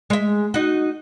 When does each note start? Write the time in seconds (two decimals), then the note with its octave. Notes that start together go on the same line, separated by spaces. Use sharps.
0.10 G#3 E5
0.54 D#4 F#4